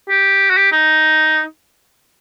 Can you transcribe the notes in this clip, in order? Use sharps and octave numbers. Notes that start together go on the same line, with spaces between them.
G4
F#4
G4
D#4